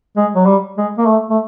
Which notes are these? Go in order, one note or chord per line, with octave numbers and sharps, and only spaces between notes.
G#3
F#3
G3
G#3
A#3
A3
A3